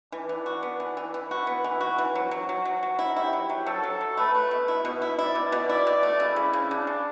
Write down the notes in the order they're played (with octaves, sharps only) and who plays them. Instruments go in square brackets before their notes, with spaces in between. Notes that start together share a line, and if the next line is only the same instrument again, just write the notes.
[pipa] E3 [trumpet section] D4
[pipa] E3
F#4
B3
E3
E3
[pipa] E3 [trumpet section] E4
[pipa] F#4
B3
E3
F#4
E3
[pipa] F#3 [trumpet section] F#4
[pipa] F#3
F#3
F#3
F#3
E4
[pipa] E4 [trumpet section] G4
[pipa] F#3
F#3
[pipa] F#3 [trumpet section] A4
[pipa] F#3
F#3
[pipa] A3 [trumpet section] B4
[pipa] A3
B2
E4
B2
E4
[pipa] E4 [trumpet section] D5
[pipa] B2
B2
[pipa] E4 [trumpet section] D5
[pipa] B2
A3
[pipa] C#3 [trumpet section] E4
[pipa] C#3
C#3
[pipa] C#3 [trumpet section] D4
[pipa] C#3